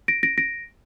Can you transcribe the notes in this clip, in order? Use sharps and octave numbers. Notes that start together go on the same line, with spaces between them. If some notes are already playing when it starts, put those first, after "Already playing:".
A#6 D7
A#6 D7
A#6 D7